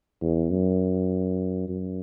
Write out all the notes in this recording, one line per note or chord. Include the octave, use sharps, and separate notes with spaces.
E2
F#2
F#2